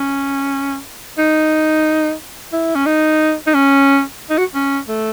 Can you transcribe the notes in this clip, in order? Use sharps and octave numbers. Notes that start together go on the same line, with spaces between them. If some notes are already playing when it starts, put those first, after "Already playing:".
Already playing: C#4
D#4
E4
C#4
D#4
D#4
C#4
D#4
F#4
C#4
A3